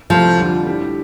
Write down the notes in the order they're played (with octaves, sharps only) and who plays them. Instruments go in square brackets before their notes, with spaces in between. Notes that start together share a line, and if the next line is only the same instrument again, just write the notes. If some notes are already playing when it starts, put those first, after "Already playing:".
[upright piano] C2 C3 A3 C4 A4 [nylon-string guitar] F3
[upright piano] F2 D3 G3 D4
A2 G3 D4 G4